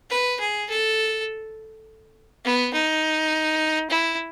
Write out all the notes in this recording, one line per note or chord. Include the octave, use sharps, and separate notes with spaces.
B4
G#4
A4
B3
D#4
E4